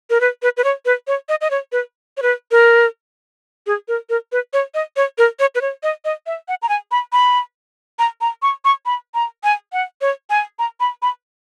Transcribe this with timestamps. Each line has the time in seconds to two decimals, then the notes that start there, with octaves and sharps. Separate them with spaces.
0.10 A#4
0.21 B4
0.43 B4
0.57 B4
0.64 C#5
0.85 B4
1.07 C#5
1.29 D#5
1.41 D#5
1.51 C#5
1.72 B4
2.17 C#5
2.22 B4
2.51 A#4
3.67 G#4
3.88 A#4
4.10 A#4
4.32 B4
4.53 C#5
4.74 D#5
4.96 C#5
5.18 A#4
5.39 C#5
5.55 B4
5.61 C#5
5.83 D#5
6.05 D#5
6.26 E5
6.48 F#5
6.62 A#5
6.69 G#5
6.91 B5
7.13 B5
7.99 A#5
8.21 A#5
8.42 C#6
8.65 C#6
8.86 B5
9.14 A#5
9.44 G#5
9.73 F#5
10.01 C#5
10.30 G#5
10.59 A#5
10.80 B5
11.02 B5